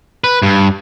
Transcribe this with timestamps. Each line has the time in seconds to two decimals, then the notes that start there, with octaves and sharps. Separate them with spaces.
0.24 B4
0.42 G2